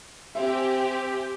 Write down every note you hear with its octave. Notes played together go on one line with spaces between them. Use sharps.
C4 G4 E5 G#5